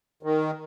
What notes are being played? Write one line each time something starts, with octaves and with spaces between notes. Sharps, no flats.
D#3